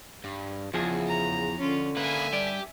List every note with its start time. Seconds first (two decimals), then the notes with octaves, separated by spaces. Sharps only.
0.24 G2
0.74 E2 C#3 F3 G#4
1.06 A#5
1.58 D3 C#4 F4
1.97 A#3 B4 E5 G#5
2.33 G2 G4 D5